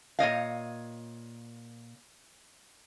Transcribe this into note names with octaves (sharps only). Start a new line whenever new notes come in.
A#2 C#5 D#5 F5